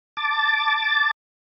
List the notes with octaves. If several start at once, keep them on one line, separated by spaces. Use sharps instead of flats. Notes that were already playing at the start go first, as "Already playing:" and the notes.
A5 D6 A6